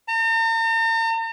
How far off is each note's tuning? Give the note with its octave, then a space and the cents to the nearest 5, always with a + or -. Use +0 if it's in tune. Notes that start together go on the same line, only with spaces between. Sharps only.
A#5 -45